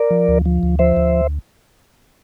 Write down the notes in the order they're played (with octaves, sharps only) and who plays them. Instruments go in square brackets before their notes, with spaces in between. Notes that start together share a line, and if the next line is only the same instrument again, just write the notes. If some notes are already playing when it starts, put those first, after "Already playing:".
Already playing: [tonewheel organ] A#4 D5
F3
D2
F3
D2
F3 C5 E5
D2